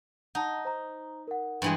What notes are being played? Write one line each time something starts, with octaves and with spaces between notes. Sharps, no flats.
D#4 F#5 A5
C5 A#5
A#4 F#5
G2 E3 G#3